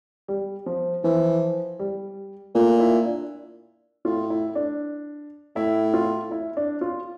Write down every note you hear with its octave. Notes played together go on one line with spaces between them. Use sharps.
G3
F3
E3 F3
G3
A#2 A3
E4
D4
A2 F4
E4
D4
A2 E4
F4
E4
D4
F4